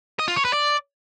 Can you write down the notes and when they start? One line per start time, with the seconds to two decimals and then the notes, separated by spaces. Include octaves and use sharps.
0.19 D#5
0.28 F4
0.36 C#5
0.45 B4
0.53 D5